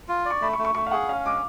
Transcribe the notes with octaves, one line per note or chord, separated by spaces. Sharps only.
F4
D5
C#6
A3 B5
C#6
A3
C#6
A3 C#6
F5
G#4 F#5
C#4 F5
G#3 D6